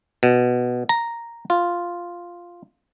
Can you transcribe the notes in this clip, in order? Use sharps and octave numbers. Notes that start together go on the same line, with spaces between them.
B2
A#5
F4